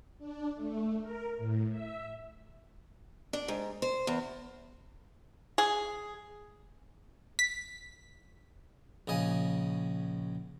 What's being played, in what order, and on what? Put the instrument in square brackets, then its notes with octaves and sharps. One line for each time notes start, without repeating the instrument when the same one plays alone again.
[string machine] D4
A3
A#4
A2
E5
[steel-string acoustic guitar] D4
G#2
C5
E2
[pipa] G#4
[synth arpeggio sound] B6
[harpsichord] A#1 C#3 D#5 G#5